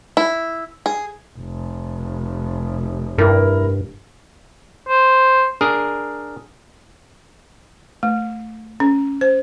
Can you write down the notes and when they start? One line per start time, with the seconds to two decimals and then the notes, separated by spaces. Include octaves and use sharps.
0.17 E4
0.86 G#4
1.39 F1
3.18 G2 E4 A#4
4.89 C5
5.61 D4 G#4 A#4
8.03 A3
8.80 C#4
9.21 C5